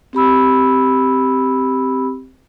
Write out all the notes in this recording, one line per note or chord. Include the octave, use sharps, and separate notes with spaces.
C4 G4 B5 E6